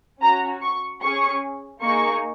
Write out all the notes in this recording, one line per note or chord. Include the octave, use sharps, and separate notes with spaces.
C#4 F#4 A#5
C#6
C#4 G#4 C#6
A#3 D#4 G#4 C#6